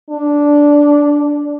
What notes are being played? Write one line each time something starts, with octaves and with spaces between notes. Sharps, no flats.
D4